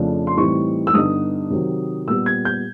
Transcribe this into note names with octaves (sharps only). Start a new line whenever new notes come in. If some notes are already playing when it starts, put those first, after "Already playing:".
Already playing: F2 C#3 F3 A3 D4
C6
A2 E3 G3 C4 D#4 C#6
E6
G2 D3 G3 B3 D#4 D#6
C3 D#3 F#3
A#2 G3 B3 E6
G#6
G6